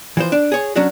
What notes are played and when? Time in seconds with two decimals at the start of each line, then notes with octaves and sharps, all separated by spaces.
0.17 E3 F3 C5
0.32 D4
0.52 G#4 C#5
0.76 F#3 C#4 D4 F#4